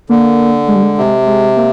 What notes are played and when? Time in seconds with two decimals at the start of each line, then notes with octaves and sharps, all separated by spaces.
0.09 D3 A#3
0.68 G#3
0.76 G3
0.83 G#3
0.98 C3
1.27 G#3
1.57 A#3